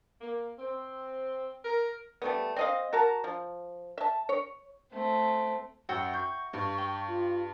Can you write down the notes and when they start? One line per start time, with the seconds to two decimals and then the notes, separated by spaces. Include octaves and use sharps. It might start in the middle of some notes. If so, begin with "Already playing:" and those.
0.21 A#3
0.59 C4
1.64 A#4
2.22 G3 A3 B3
2.56 C4 D#5 F5
2.93 F#4 A#4 A5 A#5
3.24 F3
3.98 E5 A5
4.29 C#5
4.92 A3 C4
5.89 F#2 F#4 E5 G5
6.14 C#6 G6
6.53 G2
6.78 G5
7.08 F4